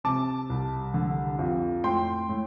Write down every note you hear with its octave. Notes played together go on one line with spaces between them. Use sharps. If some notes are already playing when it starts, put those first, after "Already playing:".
C3 A5 D6
C2
D3
F2
A2 G5 C6
A2